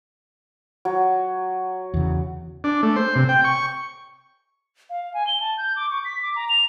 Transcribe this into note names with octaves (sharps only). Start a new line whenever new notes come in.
F#3
E2 C#3
D4
A3
C5
C3
G5
C#6
F5
G#5
G7
A5
G6
D6
C#6
B6
D6
A#5
F7